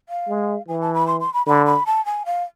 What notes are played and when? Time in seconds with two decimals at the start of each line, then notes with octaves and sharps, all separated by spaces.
0.09 F5
0.28 G#3
0.68 E3 G#5
0.81 A5
0.94 B5
1.07 C6
1.20 C6
1.34 B5
1.47 D3 B5
1.66 B5
1.86 A5
2.06 G#5
2.26 F5